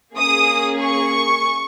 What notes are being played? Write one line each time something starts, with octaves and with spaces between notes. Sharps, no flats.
A#3 C#4 G#4 D#6
C#6